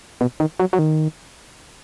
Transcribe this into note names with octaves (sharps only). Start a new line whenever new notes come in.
B2
D#3
F#3
F#3
D#3